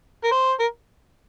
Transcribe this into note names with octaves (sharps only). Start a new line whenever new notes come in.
A#4
C5
A#4